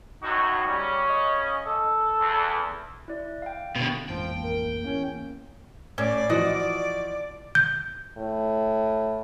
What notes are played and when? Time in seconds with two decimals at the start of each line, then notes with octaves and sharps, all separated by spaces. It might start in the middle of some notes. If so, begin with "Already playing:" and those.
0.23 F#2 A2 D#4 F#4
0.68 C#3 G3 C#4
1.09 D#5
1.66 A4
2.19 E2
3.08 E4 D5
3.42 F5 G5
3.76 B2 D3
4.09 A1 F2 G#2 F3 A#3 G5
4.43 A#4
4.84 E2 A#3 C#4
5.98 A2 C#4 D5
6.30 E3 F3 F#4 D#5
7.55 G6
8.18 A2